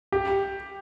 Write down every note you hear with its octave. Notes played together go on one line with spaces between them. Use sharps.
G4